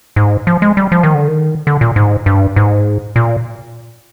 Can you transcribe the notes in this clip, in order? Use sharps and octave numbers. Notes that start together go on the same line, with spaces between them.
G#2
F3
G#3
G3
F3
D#3
D3
D#3
D3
A#2
G#2
G2
G#2
A#2